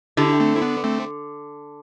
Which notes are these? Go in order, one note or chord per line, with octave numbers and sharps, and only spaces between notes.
D3 E4 G4
A3 C4
E4
B3 D4
A3 C4